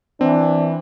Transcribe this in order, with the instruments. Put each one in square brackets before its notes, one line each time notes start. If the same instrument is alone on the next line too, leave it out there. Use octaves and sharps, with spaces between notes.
[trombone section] E3 [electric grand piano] C4 [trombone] D4